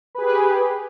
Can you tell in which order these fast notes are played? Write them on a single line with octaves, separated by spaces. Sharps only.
B4 G#4 G4